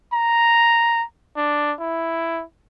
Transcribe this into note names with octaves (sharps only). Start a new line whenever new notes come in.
A#5
D4
E4